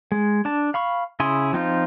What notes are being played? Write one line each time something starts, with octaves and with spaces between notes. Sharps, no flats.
G#3
D4 A5
F5 B5 C#6
C#3 E4 G#4 G#5 C6
F3 C4 D#4 F4